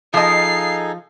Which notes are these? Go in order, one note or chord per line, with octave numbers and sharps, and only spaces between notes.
F3 D#4 G#4 A4 D#5 F5 C7